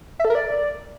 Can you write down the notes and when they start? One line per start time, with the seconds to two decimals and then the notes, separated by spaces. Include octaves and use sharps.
0.19 E5
0.25 A4
0.30 A#4
0.35 D5